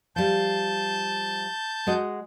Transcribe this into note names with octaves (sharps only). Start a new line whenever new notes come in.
F3 G3 A5 G6
G#3 F#4 D#5